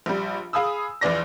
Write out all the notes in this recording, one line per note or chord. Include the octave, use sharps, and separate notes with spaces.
A#1 G3
G#4 F5 G#5 B5 D#6 E6
A#1 E2 E3 D5 A#6